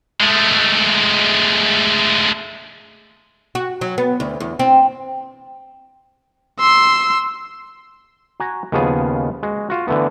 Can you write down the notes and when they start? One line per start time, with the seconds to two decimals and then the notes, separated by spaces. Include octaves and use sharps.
0.20 G#3 A3
3.55 F#4
3.81 F#3
3.98 B3
4.20 D2
4.40 E2
4.59 C4
6.60 C6 E6
8.40 F#4 G#5 A#5
8.72 D#2 C#3 F3 B3 G#4
9.43 G#3 F#4
9.70 F4 F#4
9.88 D3 E3 A3 B3